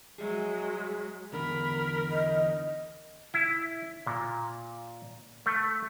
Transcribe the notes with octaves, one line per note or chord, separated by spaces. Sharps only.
F#3 G#3 G#4 E5
E2 D3 B3 A#4 B5
D#5
E4
A#2
A3